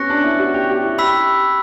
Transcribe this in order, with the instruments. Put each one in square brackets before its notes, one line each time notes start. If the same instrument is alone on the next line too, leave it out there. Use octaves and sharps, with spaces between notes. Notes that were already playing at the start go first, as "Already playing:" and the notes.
Already playing: [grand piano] B3 C#4 [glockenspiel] C#6 F#6 A#6 C#7
[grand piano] D4
E4
F#4
G4
G4
E4
[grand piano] G4 [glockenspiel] B5 E6 B6